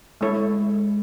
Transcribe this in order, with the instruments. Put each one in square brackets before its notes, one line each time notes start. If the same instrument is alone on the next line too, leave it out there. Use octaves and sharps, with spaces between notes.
[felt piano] G#3 [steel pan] A3 E4 A4 C#5